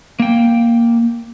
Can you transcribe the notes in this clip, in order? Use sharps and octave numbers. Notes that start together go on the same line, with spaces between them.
A#3 G5